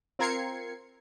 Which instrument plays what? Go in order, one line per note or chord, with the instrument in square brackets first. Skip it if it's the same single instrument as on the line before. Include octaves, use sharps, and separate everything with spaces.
[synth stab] C4 F4 A#4 G#6 C7 C#7